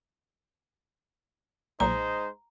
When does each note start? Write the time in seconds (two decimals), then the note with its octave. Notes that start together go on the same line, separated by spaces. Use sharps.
1.80 B1 A#2 G#3 D#4 C5 A#5